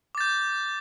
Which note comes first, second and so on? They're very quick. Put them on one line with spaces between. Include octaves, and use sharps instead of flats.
D6 A6 G6